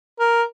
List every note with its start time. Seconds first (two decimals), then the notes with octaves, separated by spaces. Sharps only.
0.19 A#4